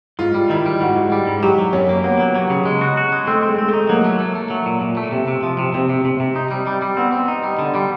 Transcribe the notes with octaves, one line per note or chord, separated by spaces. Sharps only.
G#2 F4
G3
D#3 E4
G3
G#2 F#4
G#2
G3
G#2
F#3 G4
F#3
F#2 C#4
A#3
A#3 B3
F#3
F#3
C#3
G#3
F#4
F#4
G#3
A3 C4
C4
G#3
C4
A3
D#4
F#3 A#3
A3
A3
A3
F#3
A#2
A#2
A3
C3
C3
F3
C3
C3 C4
C3
C3
C3
D#4
G3
G3
G3
B3 C4
C4
D#4
G3
D3
G3